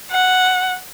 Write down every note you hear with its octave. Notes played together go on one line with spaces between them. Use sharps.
F#5